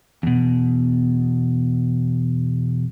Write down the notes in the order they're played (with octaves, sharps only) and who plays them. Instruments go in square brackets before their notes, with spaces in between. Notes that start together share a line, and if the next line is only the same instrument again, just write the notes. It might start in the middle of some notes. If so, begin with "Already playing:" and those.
[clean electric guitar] E2 B2